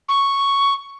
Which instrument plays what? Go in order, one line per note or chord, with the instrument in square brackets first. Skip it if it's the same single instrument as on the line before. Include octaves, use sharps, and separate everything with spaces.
[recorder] C#6